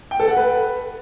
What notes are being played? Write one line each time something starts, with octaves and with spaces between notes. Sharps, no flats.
G5
A4
F#5
B4